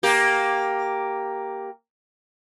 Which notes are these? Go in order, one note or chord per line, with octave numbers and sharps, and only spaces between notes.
A#3 G4